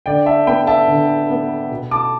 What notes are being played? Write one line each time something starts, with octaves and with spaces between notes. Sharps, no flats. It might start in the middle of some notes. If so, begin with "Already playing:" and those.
D3 D5 G5
E5 A5
B3 G5 B5
E5 A5
D3
B3
B2
A5 D6